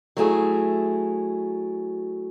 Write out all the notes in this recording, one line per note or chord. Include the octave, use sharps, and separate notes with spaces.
F#3 A3 E4 G#4